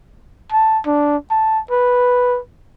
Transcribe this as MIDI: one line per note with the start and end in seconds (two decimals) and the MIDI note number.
0.52 0.79 81
0.86 1.17 62
1.31 1.60 81
1.71 2.39 71